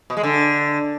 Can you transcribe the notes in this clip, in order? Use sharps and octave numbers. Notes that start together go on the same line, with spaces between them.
B2
G#3
D3